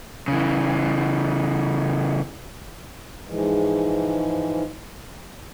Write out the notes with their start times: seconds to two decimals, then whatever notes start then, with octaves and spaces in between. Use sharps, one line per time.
0.28 C#3 E3
3.27 G#2 E3 F3 G#3